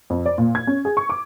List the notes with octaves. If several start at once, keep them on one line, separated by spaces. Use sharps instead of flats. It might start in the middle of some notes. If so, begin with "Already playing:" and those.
F2
D5
A#2
G#6
C#4
G#4
C#6
D6